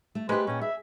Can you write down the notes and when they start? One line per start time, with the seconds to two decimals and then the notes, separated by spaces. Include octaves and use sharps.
0.15 A3
0.29 G#3 A3 G4 B4 C5
0.47 A#2 C#4 G5
0.61 G#4 E5